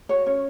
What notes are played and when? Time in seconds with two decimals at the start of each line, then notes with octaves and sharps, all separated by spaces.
0.09 F#4 C#5
0.26 C#4 C#5